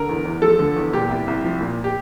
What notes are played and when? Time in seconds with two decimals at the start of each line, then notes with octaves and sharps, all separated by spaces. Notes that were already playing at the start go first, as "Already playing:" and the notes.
Already playing: D3 A#4
0.09 E2
0.25 E2
0.42 F3 A4
0.59 D3
0.76 E2
0.93 A#2 G4
1.09 C2
1.28 C2
1.44 F3
1.61 A#2
1.84 G4